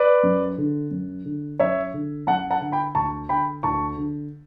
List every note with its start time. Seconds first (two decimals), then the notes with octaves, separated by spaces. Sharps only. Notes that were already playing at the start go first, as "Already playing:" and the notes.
Already playing: B4 D5
0.23 F#2
0.58 D3
0.91 F#2
1.25 D3
1.60 F#2 C#5 E5
1.94 D3
2.27 F#2 F#5 A5
2.51 F#5 A5
2.61 D3
2.72 G5 B5
2.95 D2 A5 C#6
3.29 D3 G5 B5
3.63 D2 A5 C#6
3.97 D3